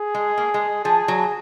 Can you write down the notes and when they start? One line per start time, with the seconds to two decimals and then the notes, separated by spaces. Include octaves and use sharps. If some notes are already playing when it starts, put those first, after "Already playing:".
Already playing: G#4
0.14 G#3
0.38 A#3
0.54 G#3
0.85 F3 G#4
1.08 F#3